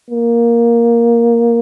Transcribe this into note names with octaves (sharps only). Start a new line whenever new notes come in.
A#3